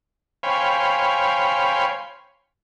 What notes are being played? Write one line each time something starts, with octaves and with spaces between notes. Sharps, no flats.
C5 C#5 F5 G5 G#5 B5